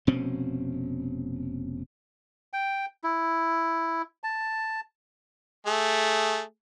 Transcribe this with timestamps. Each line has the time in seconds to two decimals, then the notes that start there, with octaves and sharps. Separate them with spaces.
0.07 F1 B2 C4 C#4
2.53 G5
3.04 E4
4.24 A5
5.67 A3 G#4